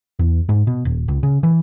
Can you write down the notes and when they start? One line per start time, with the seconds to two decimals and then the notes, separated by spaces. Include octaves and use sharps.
0.19 E2
0.49 G#2
0.67 B2
0.85 D#1
1.08 C#2
1.23 C#3
1.43 E3